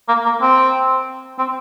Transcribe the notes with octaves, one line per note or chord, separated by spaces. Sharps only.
A#3
A#3
C4
C4